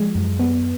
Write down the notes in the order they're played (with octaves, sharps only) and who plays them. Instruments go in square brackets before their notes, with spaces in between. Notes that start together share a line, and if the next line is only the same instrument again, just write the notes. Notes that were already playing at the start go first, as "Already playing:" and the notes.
Already playing: [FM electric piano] F3 G#3
F#2
B3